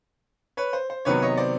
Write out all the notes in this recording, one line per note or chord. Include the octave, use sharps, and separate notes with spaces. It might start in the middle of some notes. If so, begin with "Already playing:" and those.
B4 C#5
C5
C5
C3 D#3 F#3 B3 B4 C#5
C#5 D#5
C5 D5